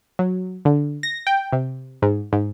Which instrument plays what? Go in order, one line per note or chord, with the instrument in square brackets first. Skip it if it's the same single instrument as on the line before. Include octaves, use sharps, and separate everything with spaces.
[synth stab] F#3
D3
A#6
G5
C3
G#2
G#2